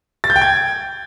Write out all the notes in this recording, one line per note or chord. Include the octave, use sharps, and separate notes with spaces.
A6
G6
G5
G#6